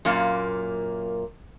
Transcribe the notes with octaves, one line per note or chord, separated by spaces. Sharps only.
F#2 A#2 A#3